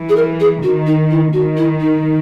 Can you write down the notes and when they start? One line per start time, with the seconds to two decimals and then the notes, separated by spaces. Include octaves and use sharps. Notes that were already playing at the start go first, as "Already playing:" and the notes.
Already playing: E3
0.09 G#4
0.16 A#4
0.40 G#4
0.63 D#3 F#4
0.87 D#4
1.11 E4
1.33 D#3 F#4
1.57 E4
1.80 D#4